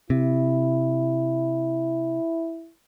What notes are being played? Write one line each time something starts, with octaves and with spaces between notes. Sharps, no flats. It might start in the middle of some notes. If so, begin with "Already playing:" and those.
C3 E4